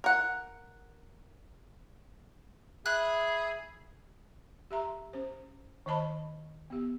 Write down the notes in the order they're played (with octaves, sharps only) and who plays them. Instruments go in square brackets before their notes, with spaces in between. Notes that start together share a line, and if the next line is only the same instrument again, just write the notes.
[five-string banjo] A#4 F#5
[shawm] G#4 [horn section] E5 [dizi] B5 [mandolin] F#6
[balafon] G4 E5 A#5 C6
C#4 C5
D#3 C5 D#5 A5 B5
B3 G4